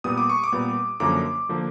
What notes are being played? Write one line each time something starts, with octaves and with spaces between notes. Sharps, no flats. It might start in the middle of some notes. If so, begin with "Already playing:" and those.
A#2 G3 B3 D#6
D6
C#6
D6
A#2 G3 B3
F#2 D3 F3 A#3 D6
D3 F3 A#3